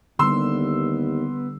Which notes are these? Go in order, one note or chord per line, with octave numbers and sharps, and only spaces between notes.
D#2 D3 G3 B3 C6 E6